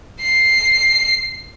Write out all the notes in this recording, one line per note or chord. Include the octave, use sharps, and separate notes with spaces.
C7